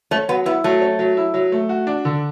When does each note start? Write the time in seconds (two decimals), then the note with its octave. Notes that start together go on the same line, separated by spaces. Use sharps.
0.11 A3 C#4
0.29 F#3 B3
0.46 B3 E4
0.64 F#3 A3
0.82 C#4
0.99 F#3
1.17 E4
1.34 F#3
1.52 A3
1.69 F#4
1.87 D4
2.05 D3